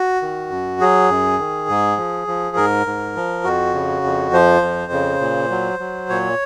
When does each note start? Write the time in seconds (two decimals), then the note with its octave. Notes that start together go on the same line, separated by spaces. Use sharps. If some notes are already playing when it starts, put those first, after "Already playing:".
Already playing: F#4
0.22 D#3
0.50 F#2
0.81 F#3 G#4
1.10 F#2
1.39 D#3
1.69 G#2
1.97 F3
2.27 F3
2.56 G#2 A#4
2.87 G#2
3.16 F3
3.44 F2 F#4
3.74 C#3
4.04 F2
4.33 F3 C5
4.62 F2
4.92 C#3
5.21 A#2
5.50 F#3
5.79 F#3
6.09 A#2 C#5